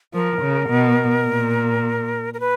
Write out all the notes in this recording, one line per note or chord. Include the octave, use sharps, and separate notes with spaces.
F3 A#4
C#3
B2
A#2
A#4
B4